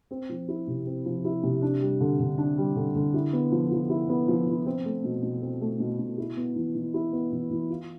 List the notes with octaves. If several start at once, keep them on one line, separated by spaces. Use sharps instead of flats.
C4
F3
E4
C3
C4
F3
E4
C3
D4
G3
D3
D3
D4
G3
D3
D3
E4
B3
F3
F3
E4
B3
F3
F3
C4
A3
B2
B2
C4
A3
B2
B2
E4
B3
E3
E3
E4
B3
E3
E3
F4